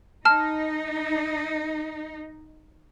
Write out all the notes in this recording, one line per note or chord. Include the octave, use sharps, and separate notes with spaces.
D#4 A5 F6